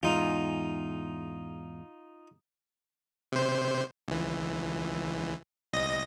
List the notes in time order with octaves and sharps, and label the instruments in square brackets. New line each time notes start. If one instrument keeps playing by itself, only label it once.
[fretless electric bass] E2 G#2 [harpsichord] D#4 F4
[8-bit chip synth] C3 C5
C#2 E3
C2 D#5 A#6